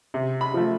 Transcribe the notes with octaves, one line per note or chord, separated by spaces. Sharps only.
C3
B5
F3 A3